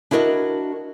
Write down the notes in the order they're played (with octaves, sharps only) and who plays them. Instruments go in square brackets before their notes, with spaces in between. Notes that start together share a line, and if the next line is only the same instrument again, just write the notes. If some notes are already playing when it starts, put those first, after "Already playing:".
[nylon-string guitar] D4 E4 F#4 A#4 B4 D#5